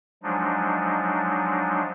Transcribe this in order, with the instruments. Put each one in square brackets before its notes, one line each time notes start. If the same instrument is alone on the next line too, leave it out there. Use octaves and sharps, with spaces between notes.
[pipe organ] F3 F#3 G#3 D4 D#4